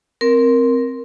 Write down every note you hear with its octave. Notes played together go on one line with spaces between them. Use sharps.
C4 A#4